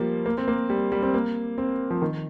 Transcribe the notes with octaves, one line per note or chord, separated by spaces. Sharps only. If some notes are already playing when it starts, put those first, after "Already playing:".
Already playing: F3 G3 A#3
A#3
C4
A#3
G3
G3
C4
A#3
C4
F3
D#3